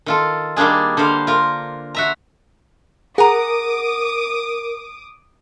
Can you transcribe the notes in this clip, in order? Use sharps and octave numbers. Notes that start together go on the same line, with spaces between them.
D#3 F4 A4
D#3 G3 A#3 D4 G#4
D3 G3 C5 F5
F4 A#4
F#4 E5 A#5
G#4 A#4 F#5 A#5 D6 D#6 D#7